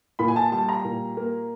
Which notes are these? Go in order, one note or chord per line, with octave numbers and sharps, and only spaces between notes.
A#2 B5
G#5
A5
G3 A5
A#5
A#2
A#3